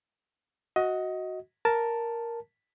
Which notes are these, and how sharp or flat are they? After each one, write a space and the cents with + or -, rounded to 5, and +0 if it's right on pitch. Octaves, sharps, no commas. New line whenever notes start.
F#4 +0 D#5 +20
A#4 +0 A5 +0